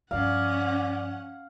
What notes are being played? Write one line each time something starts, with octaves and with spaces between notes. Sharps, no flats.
G2 F3 C#4 D5 F5 F#5